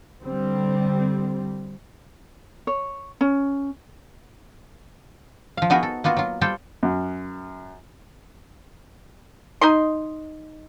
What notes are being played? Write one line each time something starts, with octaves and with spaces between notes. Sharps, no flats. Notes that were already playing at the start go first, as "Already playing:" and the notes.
D3 G3 C4
C#5
C#4
F3 F5
B3 D#4 F#4 G#4 A#4 B4
A4
A#3 B3 F4 F#4
F#3 F4
G3 F4 A4 C5 G5
F#2
D#4 D#5 C6